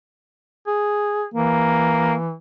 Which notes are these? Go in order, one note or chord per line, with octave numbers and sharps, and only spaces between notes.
G#4
E3 A#3